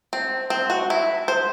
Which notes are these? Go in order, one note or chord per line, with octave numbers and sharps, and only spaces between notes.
C4
C4
F#4
E4
C5